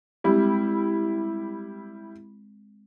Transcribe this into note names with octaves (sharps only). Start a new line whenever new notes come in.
G3 G#3 C4 E4